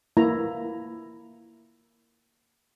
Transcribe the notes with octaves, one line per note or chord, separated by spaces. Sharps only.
A#3 E4 A#5